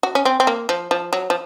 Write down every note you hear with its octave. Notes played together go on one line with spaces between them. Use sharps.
F#4
C#4
C4
C4
A#3
F3
F3
F#3
F3